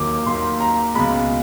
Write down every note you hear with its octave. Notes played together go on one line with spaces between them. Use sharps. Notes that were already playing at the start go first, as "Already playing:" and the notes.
Already playing: D#2 D#3 F#3 A#3 D6
D#2 D#3 F#3 A#3 C6
A#5
C#2 B2 G#3 B5